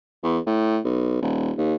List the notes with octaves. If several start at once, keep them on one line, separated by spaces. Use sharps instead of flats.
E2
A2
B1
D#1
D#2